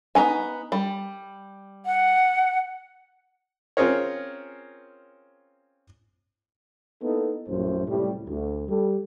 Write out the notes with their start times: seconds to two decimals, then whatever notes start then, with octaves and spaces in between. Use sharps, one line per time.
0.15 B3 D#4 G#5
0.72 G3
1.86 F#5
3.77 C4 C#4 F4 G#4 A#4 C#5
7.03 A#3 B3 D#4 E4 A4
7.48 A#1 F#2 A2 F#3 C5
7.87 C#2 A2 C3 G3
8.28 D2
8.69 G3 A4